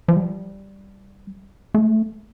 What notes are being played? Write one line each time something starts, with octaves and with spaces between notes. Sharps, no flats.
F3
G3
A3